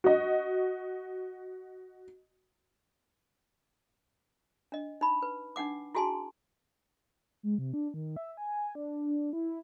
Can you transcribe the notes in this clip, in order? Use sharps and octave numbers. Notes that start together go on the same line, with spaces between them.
F#4 D#5
D4 D#5
D#4 B5
B4
D4 D#4 F#5 D6
E4 F#4 G#4 G#5 A5 C6
G#3
C3
D4
D#3
E5
G#5
D4
E4